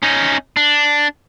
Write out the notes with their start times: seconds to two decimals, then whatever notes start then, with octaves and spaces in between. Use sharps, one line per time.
0.03 C#4 D#4
0.57 D4